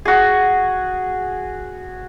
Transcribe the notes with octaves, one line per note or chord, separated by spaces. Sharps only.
F#4 G#4